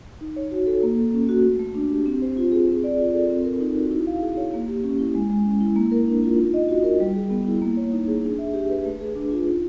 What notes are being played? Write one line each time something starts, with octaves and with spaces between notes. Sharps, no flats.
D#4
C#5
F#4
A4
A#3
A4
C#4
F#4
A3
A3
D4
G4
C4
C5
F4
G#4
C4
D5
F4
A4
C4
A#4
D#4
F#4
E4
F5
G#4
C#5
A#3
G4
C#4
E4
G#3
G#3
C#4
E4
A#3
A#4
D4
F4
D#4
D#5
F#4
A#4
G3
G#4
B3
E4
A#3
C#5
D#4
G#4
D4
E5
G4
B4
A3
G#4
D4
F4
D#4